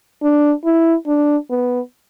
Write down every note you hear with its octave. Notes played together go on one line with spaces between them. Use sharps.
D4
E4
D4
B3